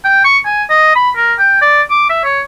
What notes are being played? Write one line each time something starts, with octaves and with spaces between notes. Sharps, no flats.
G5
C#6
G#5
D#5
B5
A#4
G5
D5
D6
E5
C#5